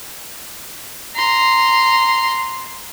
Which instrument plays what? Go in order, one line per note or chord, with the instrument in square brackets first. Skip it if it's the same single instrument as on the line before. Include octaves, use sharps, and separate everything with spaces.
[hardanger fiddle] A#5 C6